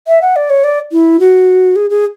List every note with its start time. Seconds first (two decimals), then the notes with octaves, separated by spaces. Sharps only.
0.07 E5
0.21 F#5
0.36 D5
0.50 C#5
0.64 D5
0.92 E4
1.19 F#4
1.76 G#4
1.90 G#4